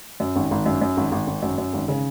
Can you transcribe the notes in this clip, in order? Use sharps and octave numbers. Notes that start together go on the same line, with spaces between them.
F#2
G#1
G#1
F#2
F#2
G#1
G#1
G#1
F#2
F#2
G#1
C#3